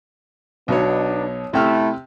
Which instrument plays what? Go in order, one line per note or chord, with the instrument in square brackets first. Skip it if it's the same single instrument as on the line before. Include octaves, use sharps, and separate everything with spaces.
[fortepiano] B1 B2 C#5 [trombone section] B3 D4 D#4
[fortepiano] C3 G5 F6 [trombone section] A3 E4